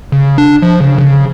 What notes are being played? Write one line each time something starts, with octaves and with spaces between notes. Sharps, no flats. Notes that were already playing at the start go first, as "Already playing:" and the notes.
C#3
D4
F3
C#3
C#3